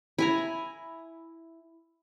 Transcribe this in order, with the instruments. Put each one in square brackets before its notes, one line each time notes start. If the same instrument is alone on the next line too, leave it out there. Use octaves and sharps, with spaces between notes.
[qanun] E4 G#5 A#5